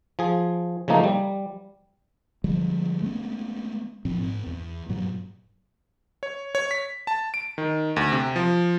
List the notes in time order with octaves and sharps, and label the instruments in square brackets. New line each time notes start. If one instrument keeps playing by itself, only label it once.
[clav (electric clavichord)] F3 G#4
C#3 F3 A3 A#3 D#4
G3
[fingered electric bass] D3 F3 G3 G#3
G#3 A3 B3 C#4
A#2 F3 C4
G#2 C4
E2
G2 A#2 F#3
[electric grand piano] C#5
C#5
B6
A5
D7
D#3
D2
C3
F3